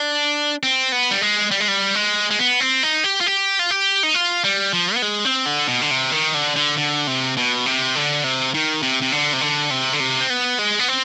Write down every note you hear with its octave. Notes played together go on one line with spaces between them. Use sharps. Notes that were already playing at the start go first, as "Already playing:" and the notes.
Already playing: D4
C4
B3
G3
G#3
G3
G#3
G3
G#3
G#3
B3
C4
D#4
G4
F4
G4
F4
G4
D#4
F4
G3
F3
B3
G#3
C4
D3
B2
D3
C3
D#3
D3
D3
D3
C3
B2
C3
D3
C3
D#3
C3
C3
D3
C3
D3
C3
D3
C3
C4
B3
G#3
B3
C4